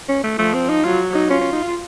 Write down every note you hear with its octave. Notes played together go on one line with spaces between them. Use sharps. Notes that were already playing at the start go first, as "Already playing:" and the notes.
C#4
A3
F3 A3
C4
D#4
F#3 F4
D#4
C#4 F4
C#4
D#4
F4